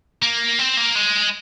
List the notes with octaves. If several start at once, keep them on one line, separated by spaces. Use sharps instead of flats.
A#3
C4
A#3
G#3